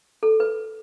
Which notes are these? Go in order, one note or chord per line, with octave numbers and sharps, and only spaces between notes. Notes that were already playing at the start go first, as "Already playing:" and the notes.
A4
B4